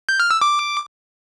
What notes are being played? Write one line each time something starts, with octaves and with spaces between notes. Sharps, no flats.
G6
F6
E6
D6